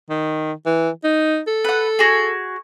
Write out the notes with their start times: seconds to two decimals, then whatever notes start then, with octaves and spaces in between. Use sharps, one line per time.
0.09 D#3
0.66 E3
1.04 D#4
1.47 A4
1.65 B4 F#5
1.99 F#4 G#4